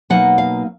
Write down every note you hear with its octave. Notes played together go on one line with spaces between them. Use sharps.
B2 F#3 A#3 D#4 F#5
F5